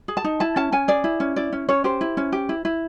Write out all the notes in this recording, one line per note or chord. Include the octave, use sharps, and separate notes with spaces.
G#4
A5
D#4
E4 A5
C#4 A5
C#4 G#5
G#4 D5
E4
C#4
E4 D5
C#4
C#4 C#5
G4 C5
E4
C#4
G4
E4
E4